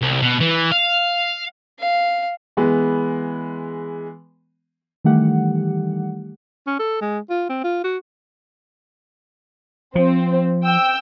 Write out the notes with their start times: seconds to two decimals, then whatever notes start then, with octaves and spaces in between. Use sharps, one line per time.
0.02 C2
0.22 B2
0.40 E3
0.72 F5
1.79 F5
2.57 E3 G#3 B3
5.04 D#3 E3 G3 A3 G4 F#5
6.67 C#4
6.79 A4
7.01 G#3
7.30 F4
7.49 C4
7.64 F4
7.84 F#4
9.96 F3 C4
10.64 G5 E6